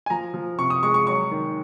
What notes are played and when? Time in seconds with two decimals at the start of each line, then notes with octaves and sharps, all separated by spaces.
0.06 G#5
0.10 F3 A#5
0.34 F3
0.58 C3 C#6
0.70 D#6
0.83 G#3 C#6
0.94 C#6
1.07 F#3 C#6
1.31 D#3